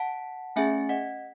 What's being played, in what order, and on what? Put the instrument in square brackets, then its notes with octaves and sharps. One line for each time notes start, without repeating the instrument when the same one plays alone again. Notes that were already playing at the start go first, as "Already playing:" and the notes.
Already playing: [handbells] F#5 A5
A3 C#4 G#4 E5 G#5
D#5 F#5